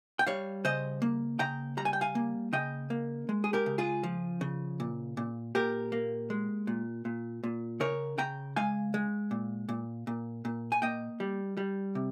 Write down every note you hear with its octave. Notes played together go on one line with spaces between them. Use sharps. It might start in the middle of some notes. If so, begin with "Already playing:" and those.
G5
G3 C#5 F5
C#3 C5 D#5
A#3
C#3 G5 A#5
G3 A#5
G#5
G5
F5 G#5
A#3
C#3 D#5 G5
A#3
G#3
G#4
G4 A#4
C#3
F4 G#4
F3
C#3
A#2
A#2
A#2 G4 A#4
A#3
G#3
A#2
A#2
A#2
C#3 A#4 C#5
C#3 G5 A#5
G#3 F5 G#5
G#3
A#2
A#2
A#2
A#2
G#5
A#3 D#5 G5
G3
G3
C3